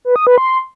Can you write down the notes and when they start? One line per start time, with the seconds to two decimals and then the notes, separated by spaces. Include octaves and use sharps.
0.05 B4
0.16 D#6
0.27 B4
0.38 C6